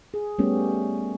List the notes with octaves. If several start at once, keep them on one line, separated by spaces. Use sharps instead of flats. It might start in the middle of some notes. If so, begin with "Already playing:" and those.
G#4
G3 A3 B3 C#4 G4